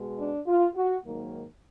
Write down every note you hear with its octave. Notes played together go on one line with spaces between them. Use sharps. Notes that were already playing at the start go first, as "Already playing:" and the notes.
Already playing: B2 G#3
D4
F4
F#4
G#2 D#3 F#3 A#3